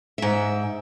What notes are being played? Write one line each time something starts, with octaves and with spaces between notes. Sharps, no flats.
G#2 E5